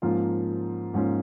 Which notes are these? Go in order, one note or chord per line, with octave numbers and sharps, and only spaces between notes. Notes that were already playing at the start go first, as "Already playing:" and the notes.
G#2 F3 A#3 C#4 F4
G#2 F3 A#3 C#4 F4